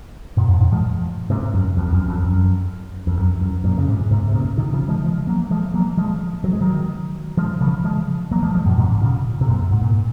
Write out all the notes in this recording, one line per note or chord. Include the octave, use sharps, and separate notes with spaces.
F#2 A#2
F2 G#2
F#2 A#2
F3 G#3
G#2 C3
F#2
F2
F#2
F2
F#2
F2
F#2
F#2
F#2 A#2
C#3
G#2 C3
G#2 C3
C3
A#2 C#3
C3 D#3
C#3 F3
F3 G#3
F3 G#3
F#3 A#3
F3 G#3
F#3 A#3
F3 G#3
F#3
G#3
D#3 F#3
F3 G#3
C#3 F3
F3 G#3
F#3 A#3
F3 G#3
F3 G#3
F#2 A#2
G#2 C3
A#2 C#3
C3
F#2 A#2
G#2
A#2